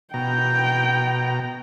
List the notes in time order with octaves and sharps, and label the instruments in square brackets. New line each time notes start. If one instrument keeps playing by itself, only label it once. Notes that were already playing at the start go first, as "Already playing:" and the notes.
[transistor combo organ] B2 A#5 [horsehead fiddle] G5